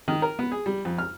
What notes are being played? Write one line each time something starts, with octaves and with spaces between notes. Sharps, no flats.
D#3
A#4
B3
G#4
G3
F2
F6